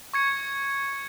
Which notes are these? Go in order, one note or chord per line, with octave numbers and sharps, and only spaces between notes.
C#6 G#6 C#7